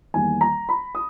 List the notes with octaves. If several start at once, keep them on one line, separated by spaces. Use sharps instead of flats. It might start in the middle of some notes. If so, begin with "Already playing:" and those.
E2 D#3 G3 A#3 G#5
A#5
B5
D#6